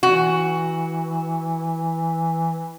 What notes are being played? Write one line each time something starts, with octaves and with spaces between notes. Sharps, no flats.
E3 F#4